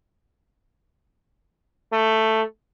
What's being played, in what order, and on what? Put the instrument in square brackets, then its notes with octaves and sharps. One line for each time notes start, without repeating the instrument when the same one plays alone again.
[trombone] A3